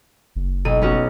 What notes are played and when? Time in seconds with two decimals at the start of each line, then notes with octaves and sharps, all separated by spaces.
0.36 F#1
0.65 B1 D#7
0.81 B3 C#4 F#4